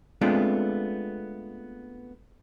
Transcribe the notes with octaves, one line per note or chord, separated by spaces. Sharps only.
G#3 A3 B3 C4 D4 F4